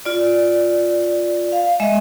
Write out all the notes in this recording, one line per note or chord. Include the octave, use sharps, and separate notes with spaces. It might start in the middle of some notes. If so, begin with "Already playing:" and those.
F4 D5
F5
G#3 D#5 E5